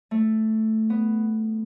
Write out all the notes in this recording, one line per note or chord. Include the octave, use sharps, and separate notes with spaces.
A3
B3